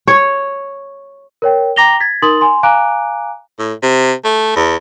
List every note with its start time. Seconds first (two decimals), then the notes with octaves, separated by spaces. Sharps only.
0.07 C#5
1.42 A#4 C#5 G5
1.76 G5 A#5 D6 A#6 F7 G7
2.00 G#6 A6 B6
2.22 D#4 A#4 C6 D#6 A6 F#7
2.41 G#5 C6
2.63 F5 G#5 A#5 D6 F#6 D7
3.59 A2
3.82 C3
4.24 A3
4.56 E2